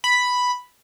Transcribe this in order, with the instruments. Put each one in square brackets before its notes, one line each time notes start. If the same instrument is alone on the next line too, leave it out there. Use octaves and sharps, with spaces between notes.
[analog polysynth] B5